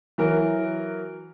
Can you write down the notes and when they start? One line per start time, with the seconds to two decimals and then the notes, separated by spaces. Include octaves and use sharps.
0.18 E3 F#3 A#4